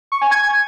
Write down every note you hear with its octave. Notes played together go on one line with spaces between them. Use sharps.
C#6
G#5
G#6